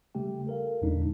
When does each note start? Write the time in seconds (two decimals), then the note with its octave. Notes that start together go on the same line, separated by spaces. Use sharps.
0.15 C#3 G3 A3 G4 G5
0.47 A4 A#4 F5
0.82 E2 A#2 D3 G#3 D4 D#4